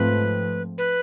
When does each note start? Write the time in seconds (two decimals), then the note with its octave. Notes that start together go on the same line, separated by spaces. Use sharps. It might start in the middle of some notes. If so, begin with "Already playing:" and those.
Already playing: G#2 F3 A3 C4 B4
0.78 B4